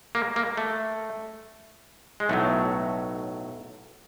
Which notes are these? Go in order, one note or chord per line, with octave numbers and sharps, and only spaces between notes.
A#3
A#3
A3
G#3
B1 A2 F#3 A3